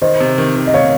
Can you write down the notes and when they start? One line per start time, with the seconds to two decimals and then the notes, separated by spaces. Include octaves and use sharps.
0.02 D#3 C5 D#5
0.20 C3
0.38 D#3
0.56 D#3
0.67 D#5
0.73 D#3 C#5 F5